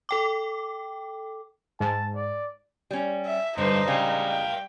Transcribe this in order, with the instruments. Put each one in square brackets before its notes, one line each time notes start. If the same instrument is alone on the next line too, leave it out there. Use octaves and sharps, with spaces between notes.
[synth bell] A4 G5 D6
[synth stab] G#2 [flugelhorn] A5
[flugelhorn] D5
[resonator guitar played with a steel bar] G3 C#4
[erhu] E5
[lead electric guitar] G2 [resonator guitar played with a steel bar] D3 [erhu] D#4 [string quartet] B4 C5
[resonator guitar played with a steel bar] C#3 G#3 [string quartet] G3 [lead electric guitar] D5 F5
[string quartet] G5